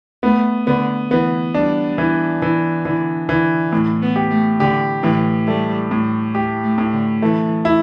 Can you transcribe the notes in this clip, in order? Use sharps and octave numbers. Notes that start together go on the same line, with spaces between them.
A3 B3
D3 B3
E3 B3
G3 D4
E3
E3
D3 E3
D3 E3
A2 E3
B3
G4
A3
D3 G4
A2 E3
G3 A3
A2
A3 G4
A3
A2
D3
E3 A3
E4